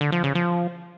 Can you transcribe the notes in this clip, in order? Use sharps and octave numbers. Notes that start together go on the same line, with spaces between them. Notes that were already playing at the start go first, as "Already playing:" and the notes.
D3
F3
C#3
F3